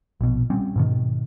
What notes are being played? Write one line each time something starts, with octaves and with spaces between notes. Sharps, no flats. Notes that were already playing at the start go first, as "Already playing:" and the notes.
A#1 B2
G3 C4 C#4
G#2 B2 D#3